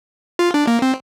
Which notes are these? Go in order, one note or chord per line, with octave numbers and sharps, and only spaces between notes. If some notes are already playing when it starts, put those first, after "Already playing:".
F4
D4
A#3
C4